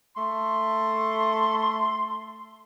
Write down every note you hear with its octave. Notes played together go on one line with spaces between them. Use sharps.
A3 C6